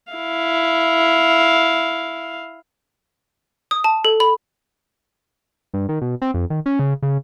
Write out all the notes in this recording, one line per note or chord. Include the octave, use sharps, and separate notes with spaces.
E4 F5
D#6
A5
A4
B5
G2
D#3
B2
C4
F2
D#3
C#4
C#3
C#3